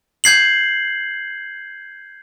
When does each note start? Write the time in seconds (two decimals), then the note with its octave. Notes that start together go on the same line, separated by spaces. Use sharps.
0.24 G6 G#6 C7 F#7